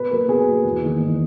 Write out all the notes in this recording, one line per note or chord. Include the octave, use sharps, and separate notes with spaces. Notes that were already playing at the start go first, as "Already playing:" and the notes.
Already playing: B2 B4
F#3 A#3 A#4
B2 G#4
F#3 A#3
E2
D#3 A#3 D#4
E2